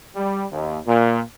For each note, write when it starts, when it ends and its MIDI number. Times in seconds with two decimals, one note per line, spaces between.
0.16 0.44 55
0.51 0.78 39
0.87 1.19 46